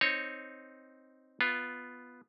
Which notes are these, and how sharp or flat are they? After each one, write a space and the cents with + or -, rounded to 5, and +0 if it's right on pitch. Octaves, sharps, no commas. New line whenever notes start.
C4 +0 D#4 +0 C#5 -5
B3 +0 F4 +0